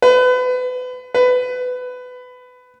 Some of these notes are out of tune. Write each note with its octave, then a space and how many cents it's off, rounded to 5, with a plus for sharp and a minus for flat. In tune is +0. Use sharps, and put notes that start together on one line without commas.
B4 +30
B4 +20